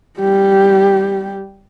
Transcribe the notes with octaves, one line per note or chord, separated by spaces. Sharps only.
G3 G4